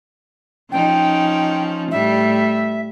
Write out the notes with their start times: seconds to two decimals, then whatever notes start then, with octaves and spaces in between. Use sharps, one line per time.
0.72 F3 C#4 D#4 G5
1.91 A2 G3 E5